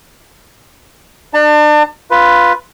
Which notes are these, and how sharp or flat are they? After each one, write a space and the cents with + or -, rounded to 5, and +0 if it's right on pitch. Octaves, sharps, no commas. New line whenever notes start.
D4 +35 A5 +35
F4 +0 B4 +0